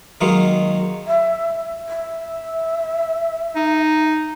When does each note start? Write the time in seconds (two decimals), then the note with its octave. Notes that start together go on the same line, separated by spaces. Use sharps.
0.21 D#3 F#3 G#3 A#3
1.07 E5
1.87 E5
3.56 D#4